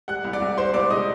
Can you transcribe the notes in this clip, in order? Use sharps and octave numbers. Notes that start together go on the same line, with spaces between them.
G3 F#5 F#6
C2
D5 D6
C2
G3 C5 C6
C2 D5 D6
C3 D#5 D#6